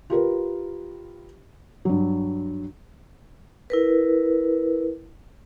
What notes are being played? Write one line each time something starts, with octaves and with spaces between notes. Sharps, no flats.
F4 G4 A#4 B4
G2 F#3
E4 A#4 B4